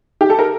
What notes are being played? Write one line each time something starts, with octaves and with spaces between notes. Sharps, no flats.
G4
A4
A#4